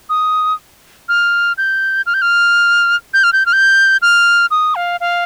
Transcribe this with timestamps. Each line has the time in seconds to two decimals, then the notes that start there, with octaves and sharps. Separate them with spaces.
0.09 D#6
1.09 F6
1.58 G6
2.06 F6
2.14 G6
2.22 F6
3.14 G6
3.24 F6
3.33 G6
3.46 F6
3.53 G6
4.02 F6
4.51 D#6
4.75 F5
5.00 F5